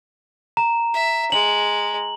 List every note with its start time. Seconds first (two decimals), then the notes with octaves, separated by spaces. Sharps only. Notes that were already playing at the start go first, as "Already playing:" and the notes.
0.57 A#5
0.94 E5
1.32 G#3 F#7